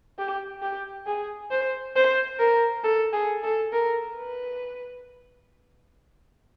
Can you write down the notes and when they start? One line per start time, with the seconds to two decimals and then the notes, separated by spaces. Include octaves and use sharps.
0.19 G4
0.62 G4
1.06 G#4
1.51 C5
1.96 C5
2.39 A#4
2.84 A4
3.13 G#4
3.43 A4
3.72 A#4
4.16 B4